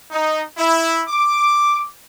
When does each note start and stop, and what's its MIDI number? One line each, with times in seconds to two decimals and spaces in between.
0.11 0.43 63
0.57 1.02 64
1.09 1.86 86